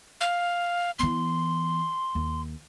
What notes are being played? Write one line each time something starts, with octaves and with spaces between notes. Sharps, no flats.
F5
E3 B3 C6
D#2